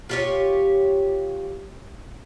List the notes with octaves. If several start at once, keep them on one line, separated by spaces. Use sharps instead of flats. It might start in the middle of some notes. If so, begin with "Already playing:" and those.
F4 G4 C#5